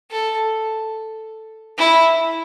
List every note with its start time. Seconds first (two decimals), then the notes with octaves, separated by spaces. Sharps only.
0.11 A4
1.78 E4